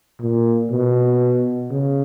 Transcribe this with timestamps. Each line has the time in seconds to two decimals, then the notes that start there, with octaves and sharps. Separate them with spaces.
0.21 A#2
0.71 B2
1.70 C#3